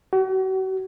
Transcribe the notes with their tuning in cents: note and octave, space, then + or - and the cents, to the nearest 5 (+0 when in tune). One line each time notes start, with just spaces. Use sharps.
F#4 +40